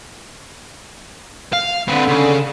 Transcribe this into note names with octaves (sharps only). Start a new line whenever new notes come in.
F5
D3 C4 B4
C#3